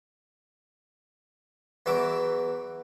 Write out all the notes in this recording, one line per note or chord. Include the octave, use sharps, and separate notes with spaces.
E2 E3 F#3 E5 D6